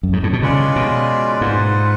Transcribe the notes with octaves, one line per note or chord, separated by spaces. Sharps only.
F#2
G#2
A2
B2
C#3 G#3 C#4 F4 B4 D5
B2
G#2 F4 B4 F#5